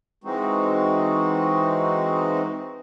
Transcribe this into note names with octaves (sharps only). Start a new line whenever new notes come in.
E3 G#3 C4 D#4 F#4